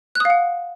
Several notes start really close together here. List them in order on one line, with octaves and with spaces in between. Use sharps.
F#6 D#6 F5 F#5